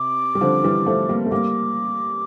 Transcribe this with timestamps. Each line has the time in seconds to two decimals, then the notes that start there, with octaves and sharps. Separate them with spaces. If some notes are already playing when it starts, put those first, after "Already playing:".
Already playing: C3 D6
0.35 G3
0.41 D3 F3
0.63 E3 G3
0.86 F3 A3
1.09 G3 A#3
1.25 A3
1.31 G3 A#3 D6